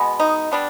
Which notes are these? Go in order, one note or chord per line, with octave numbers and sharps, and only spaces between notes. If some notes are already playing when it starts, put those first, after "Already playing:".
Already playing: B2 G#3 B3
D#4
G3 B3 D4